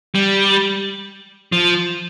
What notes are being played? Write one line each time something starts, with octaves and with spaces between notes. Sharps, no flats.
G3
F3